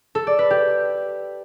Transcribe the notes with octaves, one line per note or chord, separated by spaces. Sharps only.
A4
D5
B4
G4